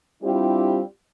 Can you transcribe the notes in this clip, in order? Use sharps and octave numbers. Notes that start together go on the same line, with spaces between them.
G3 C4 D4 E4 F4 G4